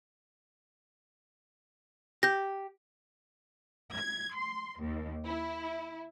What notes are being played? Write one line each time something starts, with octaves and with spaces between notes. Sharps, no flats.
G4 G6 A#6
G#6
C6
D#2
E4